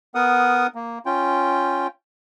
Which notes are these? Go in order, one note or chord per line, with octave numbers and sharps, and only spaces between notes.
B3 A#4 F#5 D#6
A#3
C#4 F4 G5